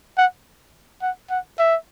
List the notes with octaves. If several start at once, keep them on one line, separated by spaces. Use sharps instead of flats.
F#5
F#5
F#5
E5